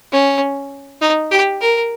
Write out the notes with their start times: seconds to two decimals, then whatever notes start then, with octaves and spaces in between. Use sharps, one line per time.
0.12 C#4
1.01 D#4
1.31 G4
1.61 A#4